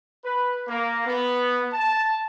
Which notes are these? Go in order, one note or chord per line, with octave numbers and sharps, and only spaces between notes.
B4
A#3
B3
A5